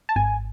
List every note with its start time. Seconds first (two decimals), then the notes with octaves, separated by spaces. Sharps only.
0.09 A5
0.16 G#1 G#5